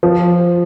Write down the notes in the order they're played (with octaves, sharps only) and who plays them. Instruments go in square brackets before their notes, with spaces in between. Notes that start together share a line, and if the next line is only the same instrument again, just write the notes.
[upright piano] F3